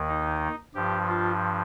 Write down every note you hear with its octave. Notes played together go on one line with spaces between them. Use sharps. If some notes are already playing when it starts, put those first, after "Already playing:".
Already playing: D#2 D#3
D#4
G2 F3 G4
F4